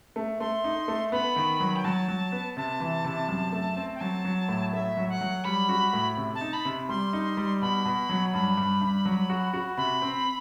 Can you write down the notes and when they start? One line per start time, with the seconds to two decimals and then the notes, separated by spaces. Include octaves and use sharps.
0.16 A3
0.40 A3 C6
0.64 D#4
0.88 A3
1.12 B3 B5
1.36 D#3
1.60 F#3
1.76 G5
1.84 F#3 A5
2.08 F#3
2.32 B3
2.56 C3 A5
2.80 E3
3.04 C3
3.29 F#2
3.52 A3
3.77 C4
3.95 G5
4.01 F#3 A5
4.25 F#3
4.49 A2
4.73 A3 E5
4.97 F#3
5.09 F#5
5.21 F#3
5.44 G3 B5
5.69 F#4
5.93 A2
6.17 C3
6.35 A5
6.41 D#4
6.53 B5
6.65 C3
6.89 G3 C6
7.13 D#4
7.37 G3
7.61 B2 B5
7.85 B2
8.09 F#3
8.33 G2 B5
8.57 G2
8.81 G2
9.05 F#3
9.30 F#4
9.54 F#4
9.77 C3 B5
10.02 C4